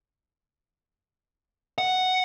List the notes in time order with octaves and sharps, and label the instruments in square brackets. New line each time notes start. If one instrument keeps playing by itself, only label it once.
[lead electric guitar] F#5